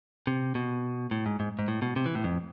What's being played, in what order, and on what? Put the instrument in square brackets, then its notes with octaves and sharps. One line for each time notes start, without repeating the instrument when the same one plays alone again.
[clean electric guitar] C3
B2
A2
G#2
G#2
G#2
A2
B2
C3
E3
A2
F2